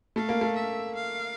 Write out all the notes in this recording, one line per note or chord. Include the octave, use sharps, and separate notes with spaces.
A3 F5
A#3
A3
E5
F5